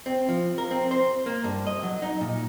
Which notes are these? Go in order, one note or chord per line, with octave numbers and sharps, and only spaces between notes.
C4
F3
A#4
C4
C5
A#3
G2
D#5
F#3
D#4
A#2